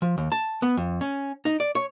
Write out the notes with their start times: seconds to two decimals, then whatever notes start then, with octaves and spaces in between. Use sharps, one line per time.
0.02 F3
0.18 D#2
0.32 A5
0.62 B3
0.77 F2
1.01 C#4
1.45 D#4
1.60 D5
1.75 C#5